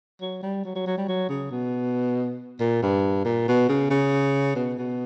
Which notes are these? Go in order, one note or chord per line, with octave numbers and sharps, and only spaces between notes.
F#3
G3
F#3
F#3
F#3
G3
F#3
C#3
B2
A#2
G2
A#2
B2
C#3
C#3
B2
B2